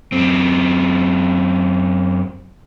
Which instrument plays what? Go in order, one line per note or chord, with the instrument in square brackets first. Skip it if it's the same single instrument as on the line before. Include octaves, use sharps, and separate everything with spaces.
[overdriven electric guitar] F#2 C4